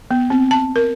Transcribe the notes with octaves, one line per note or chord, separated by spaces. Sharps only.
B3
C4
A5
A#4